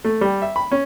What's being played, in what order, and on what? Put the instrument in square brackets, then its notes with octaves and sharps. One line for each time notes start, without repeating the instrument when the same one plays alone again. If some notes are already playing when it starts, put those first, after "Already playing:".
[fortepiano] A3
G3
E5
B5
C#4